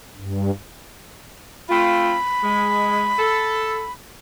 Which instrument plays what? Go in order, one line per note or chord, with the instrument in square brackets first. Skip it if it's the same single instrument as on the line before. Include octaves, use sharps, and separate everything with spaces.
[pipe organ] G2
[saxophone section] A3 C4 F4 [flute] B5
[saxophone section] G#3
A4